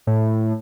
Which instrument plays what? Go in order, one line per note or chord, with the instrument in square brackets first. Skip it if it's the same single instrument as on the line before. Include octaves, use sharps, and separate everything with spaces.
[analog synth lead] A2